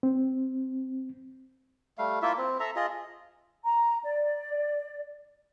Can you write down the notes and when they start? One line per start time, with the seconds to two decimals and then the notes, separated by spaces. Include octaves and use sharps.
0.03 C4
1.98 G3 A3 F5
2.22 A#3 E4 F4 E5
2.38 C4
2.60 A4 E5 A#5
2.76 F4 G#4 D#5
3.64 A#5
4.04 D5